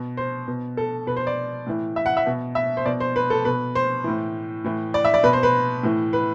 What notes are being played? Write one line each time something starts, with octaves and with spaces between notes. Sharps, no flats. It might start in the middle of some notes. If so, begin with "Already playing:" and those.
Already playing: B2
C5
B2
A4
B2 B4
C5
D5
A2 E3
E5
F#5
E5
B2
E5
C5
B2 D5
C5
B4
A4
B2 B4
C5
A2 E3
A2 E3
D5
E5
D5
B2 B4
C5
B4
A2 E3
B4